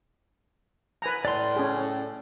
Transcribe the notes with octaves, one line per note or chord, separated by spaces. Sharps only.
B4 G#5 A#5
A2 D5 C6
C#4 G#4